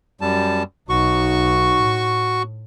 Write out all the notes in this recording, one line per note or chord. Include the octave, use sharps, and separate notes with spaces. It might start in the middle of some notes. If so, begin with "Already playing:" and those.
F#2 G3 A5
B1 D#4 F#4 C#6
A2